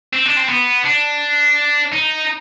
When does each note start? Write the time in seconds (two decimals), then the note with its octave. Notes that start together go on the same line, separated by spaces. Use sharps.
0.13 C4
0.25 D4
0.36 C4
0.49 B3
0.85 D4
1.92 D#4